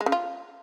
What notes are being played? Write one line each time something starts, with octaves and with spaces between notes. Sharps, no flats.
G#3
C#3
F4